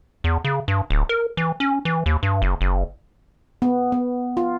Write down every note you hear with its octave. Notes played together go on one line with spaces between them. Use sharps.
E2
C#3
G2
D1
A#4
E3
C#4
E3
D#2
G2
F#1
F#1
B3
B3
F4